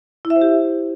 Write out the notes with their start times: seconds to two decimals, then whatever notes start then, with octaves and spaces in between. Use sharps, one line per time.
0.25 E4
0.30 E5
0.36 C5
0.41 G4